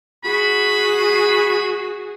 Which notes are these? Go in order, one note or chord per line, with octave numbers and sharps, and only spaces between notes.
F#4 G#4 B5